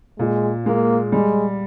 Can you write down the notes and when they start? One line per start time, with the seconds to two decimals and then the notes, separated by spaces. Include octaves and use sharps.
0.18 A#2 G#3
0.66 G#3 A#3
1.12 G3 G#3